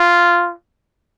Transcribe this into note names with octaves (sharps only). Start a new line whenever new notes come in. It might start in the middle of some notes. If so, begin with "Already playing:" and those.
Already playing: F4